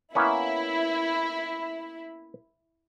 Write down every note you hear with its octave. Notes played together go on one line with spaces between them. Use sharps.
A#3 B3 C#4 E4